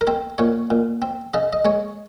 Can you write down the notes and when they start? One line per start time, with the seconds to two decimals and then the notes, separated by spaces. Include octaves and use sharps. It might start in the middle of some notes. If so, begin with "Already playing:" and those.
0.01 A#4
0.07 C4 C5
0.38 A#2 C#5
0.70 A#2
1.02 C4
1.34 C#3 D#5
1.53 D#5
1.65 G#3 C#5